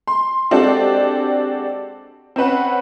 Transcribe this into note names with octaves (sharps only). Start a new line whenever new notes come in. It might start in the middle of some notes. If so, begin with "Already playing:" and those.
C6
G#3 C4 D4 F#4 G4 A4
C4 C#4 B4 F#5